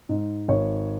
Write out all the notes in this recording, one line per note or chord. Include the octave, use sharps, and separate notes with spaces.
G#2
G#1 C#5